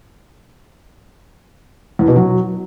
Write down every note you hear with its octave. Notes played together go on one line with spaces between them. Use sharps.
E2
B2
F#3